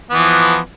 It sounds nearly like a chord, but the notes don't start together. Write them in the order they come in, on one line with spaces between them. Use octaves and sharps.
B3 E3 F3